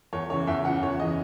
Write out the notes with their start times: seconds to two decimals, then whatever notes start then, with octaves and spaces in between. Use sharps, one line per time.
0.13 E2 C#5
0.30 C#3 E3 C#5
0.47 E2 E5
0.65 C#3 E3 F#5
0.82 E2 C#5
1.00 C#3 E3 D#5